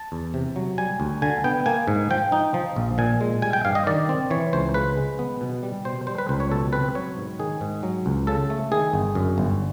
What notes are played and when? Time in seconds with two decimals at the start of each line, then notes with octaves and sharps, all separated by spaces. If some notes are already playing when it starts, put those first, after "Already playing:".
Already playing: A5
0.12 E2
0.34 C3
0.56 F#3
0.78 G3 G#5
1.00 D2
1.22 D3 G#5
1.44 B3 G5
1.66 A#3 G#5
1.88 G#2
2.10 F3 G5
2.32 D#4
2.54 F3
2.76 A#1
2.98 A#2 G#5
3.21 G#3
3.42 G3 G#5
3.53 G5
3.65 G2 F5
3.75 D#5
3.87 D#3 D5
4.09 C4
4.31 E3 C#5
4.53 C#2 C5
4.74 C#3 B4
4.97 G#3
5.19 B3
5.41 B2
5.63 G3
5.85 B2 C5
6.07 G3 C5
6.18 B4
6.29 C#2 C5
6.40 C#5
6.51 B2 A4
6.73 C4 B4
6.95 F#3 C#5
7.17 G#2
7.39 D#3 G#4
7.61 G#2
7.83 F#3
8.06 C#2
8.27 C#3 A4
8.50 A3
8.72 D#3 G#4
8.93 G1
9.15 F#2
9.38 G1